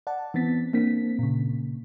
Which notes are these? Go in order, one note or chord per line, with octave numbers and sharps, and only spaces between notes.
D5 F#5 A5
E3 B3 C4 A6 B6
A#3 C4 D4 B6
A#2 C#3